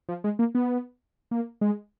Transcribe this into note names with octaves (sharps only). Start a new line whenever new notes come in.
F3
G#3
A#3
B3
A#3
G#3